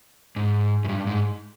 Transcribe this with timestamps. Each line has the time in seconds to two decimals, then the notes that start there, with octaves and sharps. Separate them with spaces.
0.36 G#2
0.84 F#2
0.89 G2
1.07 G#2